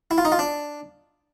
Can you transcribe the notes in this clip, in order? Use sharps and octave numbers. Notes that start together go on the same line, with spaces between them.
E4
F4
D#4
F4
D4